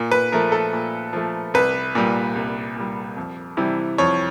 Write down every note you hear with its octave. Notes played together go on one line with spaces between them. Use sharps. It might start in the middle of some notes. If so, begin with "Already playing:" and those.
Already playing: A#2
B4
F3 A3 A#4
A4
A#2
F3 A3
C2 B4
A#2 G3
C2
A#2 G3
F2
C3 E3 G3
F2 C#5